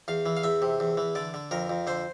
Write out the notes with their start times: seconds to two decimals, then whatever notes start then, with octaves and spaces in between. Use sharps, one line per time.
0.08 E2 F5
0.26 E3
0.37 F5
0.43 E2 E5
0.62 C3
0.80 E2
0.97 E3
1.15 D3 D5
1.34 D3
1.51 F2 A#4
1.69 F2
1.87 D3 C5